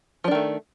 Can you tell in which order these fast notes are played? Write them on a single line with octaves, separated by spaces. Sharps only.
F3 D4 D#3 A3